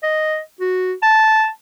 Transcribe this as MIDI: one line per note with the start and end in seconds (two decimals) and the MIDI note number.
0.03 0.39 75
0.60 0.93 66
1.03 1.48 81